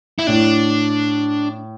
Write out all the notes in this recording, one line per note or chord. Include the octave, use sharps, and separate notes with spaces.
E4
A2 D4